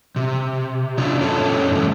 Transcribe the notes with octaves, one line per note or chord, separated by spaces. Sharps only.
C3
C#4 D4 E4 F4
F#2 C#4 E4 A4 C#5 A5
G#2 C3 E3 G#3